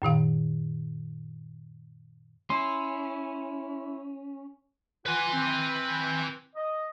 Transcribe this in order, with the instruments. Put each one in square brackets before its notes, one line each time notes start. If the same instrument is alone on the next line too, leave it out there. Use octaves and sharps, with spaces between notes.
[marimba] F#2 A#2 D#3 F5
[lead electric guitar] C#4 [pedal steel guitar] E4 C6
[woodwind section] F4 F#5 [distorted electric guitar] B4 G#5
[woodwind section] C4
D#5